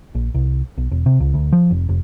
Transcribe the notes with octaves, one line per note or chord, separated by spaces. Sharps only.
A#1
C2
B1
E1
C3
C#2
D2
F3
F1
F1